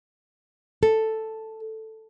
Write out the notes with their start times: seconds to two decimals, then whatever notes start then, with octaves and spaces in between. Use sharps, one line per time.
0.83 A4